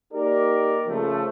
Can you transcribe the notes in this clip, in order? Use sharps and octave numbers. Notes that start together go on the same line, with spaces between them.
A#3 D#4 G4 A#4 D5
C#3 F3 A3